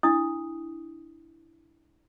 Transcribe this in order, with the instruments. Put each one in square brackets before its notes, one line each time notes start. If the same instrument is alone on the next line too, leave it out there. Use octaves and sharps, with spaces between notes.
[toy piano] D4 E4 D#6